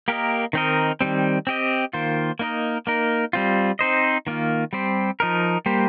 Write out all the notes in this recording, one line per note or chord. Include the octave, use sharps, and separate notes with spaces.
A#3 G4 A#4 D#5
D#3 C4 D#4 A#4 D#5
D#3 G3 C4
C4 G4 D#5
D#3 A#3 F4 C5
A#3 D#4 A#4 D#5
A#3 D#4 A#4
G3 C4 F4
C4 D#4 C5 D#5
D#3 A#3 F4
G3 C4 G4 C5
F3 D#4 A#4
G3 A#3 G4 C5